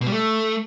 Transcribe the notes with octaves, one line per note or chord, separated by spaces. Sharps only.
B2
G3
A3